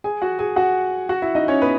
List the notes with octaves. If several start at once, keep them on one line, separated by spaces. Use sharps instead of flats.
G#4 G#5
F#4 F#5
G#4 G#5
F#4 F#5
F#4 F#5
E4 E5
D#4 D#5
C#4 C#5
B3 B4